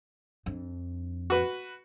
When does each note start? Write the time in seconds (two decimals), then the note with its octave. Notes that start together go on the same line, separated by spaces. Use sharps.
0.46 F2 D4
1.30 F#4 B4